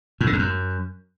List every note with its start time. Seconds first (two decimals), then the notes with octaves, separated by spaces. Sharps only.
0.21 A2
0.27 D3
0.33 F2
0.39 F#2